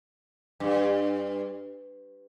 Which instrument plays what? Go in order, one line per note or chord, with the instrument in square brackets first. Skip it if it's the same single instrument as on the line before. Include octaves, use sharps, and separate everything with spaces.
[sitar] G2